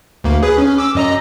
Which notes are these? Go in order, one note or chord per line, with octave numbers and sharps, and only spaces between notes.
D2 A#3
G#4 B4
C#4
D6 E6
F#2 D#5 A#5